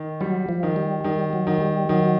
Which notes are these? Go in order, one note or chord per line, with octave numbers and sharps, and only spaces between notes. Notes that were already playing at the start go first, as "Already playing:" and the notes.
Already playing: D#3
F#3 G3
F3
D#3
G3
D#3 G3
F#3
D#3
G3
D#3 F#3